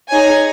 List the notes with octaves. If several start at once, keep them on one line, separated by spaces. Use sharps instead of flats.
D#4 G#4 C#5 G#5